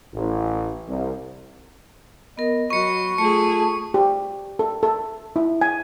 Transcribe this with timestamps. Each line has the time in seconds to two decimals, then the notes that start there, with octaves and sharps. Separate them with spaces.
0.13 A1
0.88 C2
2.38 B3 A#4 D#5
2.70 F#3 B5 C#6 C#7
3.18 A3 F4 G#4 A5 C#7
3.94 G4
4.59 A4
4.83 A4
5.36 E4
5.61 G#5